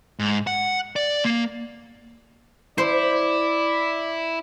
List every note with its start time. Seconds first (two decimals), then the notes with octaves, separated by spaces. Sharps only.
0.19 G#2
0.47 F#5
0.96 D5
1.25 A#3
2.78 E4 C5 D5